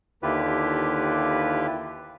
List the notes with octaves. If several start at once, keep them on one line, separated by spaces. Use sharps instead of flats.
D#2 D3 E4 F4 G4 B4